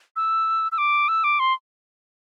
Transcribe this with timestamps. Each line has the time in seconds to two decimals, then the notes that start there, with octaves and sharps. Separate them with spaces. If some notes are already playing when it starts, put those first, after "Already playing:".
0.16 E6
0.72 E6
0.78 D6
1.08 E6
1.24 D6
1.40 C6